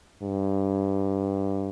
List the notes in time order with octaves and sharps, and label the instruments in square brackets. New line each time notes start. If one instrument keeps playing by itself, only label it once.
[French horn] G2